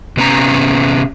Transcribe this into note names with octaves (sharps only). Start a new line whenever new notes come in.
C3 B3 C#4 A#5